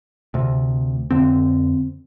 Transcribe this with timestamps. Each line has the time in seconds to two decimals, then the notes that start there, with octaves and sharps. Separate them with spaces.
0.34 D2 C3
1.11 F2 D3 C4